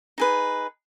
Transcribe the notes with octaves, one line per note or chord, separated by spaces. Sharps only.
D#4 G#4 B4